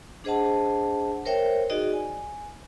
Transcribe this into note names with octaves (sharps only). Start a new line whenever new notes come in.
D4 G#4 C5 D#5 F#5 A5
A#4 C5 C#5 E5 G5
D#4 F#4 G#4 D5 D#5
G#5